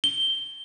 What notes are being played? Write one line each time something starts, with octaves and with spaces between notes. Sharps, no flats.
G7